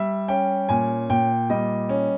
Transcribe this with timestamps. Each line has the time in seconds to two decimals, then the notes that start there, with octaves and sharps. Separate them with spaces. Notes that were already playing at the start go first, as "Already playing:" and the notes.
Already playing: G3 E5
0.28 C#4 G5
0.69 A#2 G#5
1.10 A#2 G5
1.50 G3 D#5
1.89 C#4